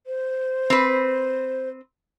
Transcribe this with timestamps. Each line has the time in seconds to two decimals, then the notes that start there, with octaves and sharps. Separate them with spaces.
0.06 C5
0.70 C4 B4